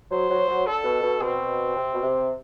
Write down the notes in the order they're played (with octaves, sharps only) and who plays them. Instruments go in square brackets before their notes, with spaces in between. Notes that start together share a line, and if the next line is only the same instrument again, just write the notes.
[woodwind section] F#3 [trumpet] C5
[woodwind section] F#3
F#3
[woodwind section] D3 [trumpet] A4
[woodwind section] B2
B2
[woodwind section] B2 [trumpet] C4
[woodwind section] C3
B2
C3